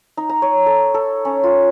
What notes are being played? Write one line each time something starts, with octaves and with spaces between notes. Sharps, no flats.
D#4
A#5
C#5
A4
A4
C#4
F4